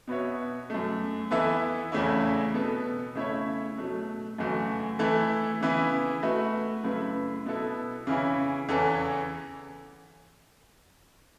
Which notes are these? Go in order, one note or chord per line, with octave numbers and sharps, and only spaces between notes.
B2 B3 F#4 C#5 E5
F#2 F#3 A3
E3 B3 E4 A4 E5
E2 C#3 A3 C#4 E4
B2 B3 A4
C#3 A3 E4 C#5 E5
B2 F#3 A3
F#2 C#3 E3 A3 F#4
E3 A3 E4 A4
C#3 E3 B3 E4
A3 F#4 B4 E5
F#2 C#3 A3 E4 B4
B2 B3 E4 A4
C#3 E3 C#4 E4
E2 C#3 E3 C#4 A4